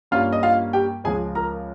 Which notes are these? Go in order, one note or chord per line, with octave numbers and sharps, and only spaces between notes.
G2 G3 A#3 C#4 F4 F5
D#5
F4 F5
G4 G5
C#2 C#3 F3 G#3 G#4 G#5
A#4 A#5